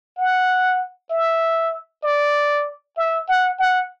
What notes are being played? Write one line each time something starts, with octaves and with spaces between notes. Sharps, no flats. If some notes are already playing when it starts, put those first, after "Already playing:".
F#5
E5
D5
E5
F#5
F#5